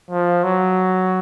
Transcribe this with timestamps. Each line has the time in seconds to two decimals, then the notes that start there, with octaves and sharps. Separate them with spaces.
0.10 F3
0.44 F#3